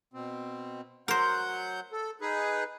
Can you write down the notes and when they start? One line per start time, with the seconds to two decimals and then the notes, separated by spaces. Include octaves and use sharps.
0.14 B2 C4
1.08 F#3 A#4 C5 F#5 G6
1.92 A4
2.21 D#4 G#4 B4